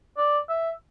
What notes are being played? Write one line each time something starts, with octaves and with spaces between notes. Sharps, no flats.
D5
E5